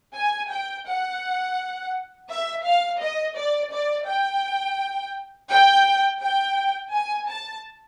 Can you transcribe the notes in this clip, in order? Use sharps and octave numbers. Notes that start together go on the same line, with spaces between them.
G#5
G5
F#5
E5
F5
D#5
D5
D5
G5
G5
G5
G#5
A5